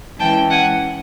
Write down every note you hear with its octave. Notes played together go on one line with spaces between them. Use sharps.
E3 G#3 C#4 G5 A5
F#5 G#5